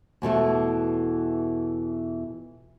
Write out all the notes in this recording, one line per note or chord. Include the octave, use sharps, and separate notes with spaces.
E2 B2 E3 A3